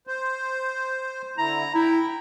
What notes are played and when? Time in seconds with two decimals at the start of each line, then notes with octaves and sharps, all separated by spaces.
0.07 C5
1.38 D3 E4 A#5
1.75 E4 G5